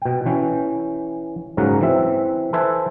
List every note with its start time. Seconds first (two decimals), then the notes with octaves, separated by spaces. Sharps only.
0.02 B2 G5
0.26 E3 C#4 G5
1.57 G#2 C#3 F#3 C#4 A#4 F#5
1.81 E3 C4 E5
2.53 A4 B4 C5 E5 G#5